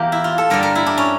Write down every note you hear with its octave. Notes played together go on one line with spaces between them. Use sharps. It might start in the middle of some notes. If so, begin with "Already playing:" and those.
Already playing: E2 E3 A#3 G4 A#4
E4
F4
A4
G2 D3 G3 A#4
A#4
E4
D4
C#4